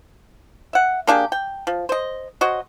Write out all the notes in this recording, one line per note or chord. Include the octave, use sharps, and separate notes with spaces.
E5 F#5
A#3 D4 G4 G#4
G5
F3
C5 D#5
F#3 F#4 C5 D#5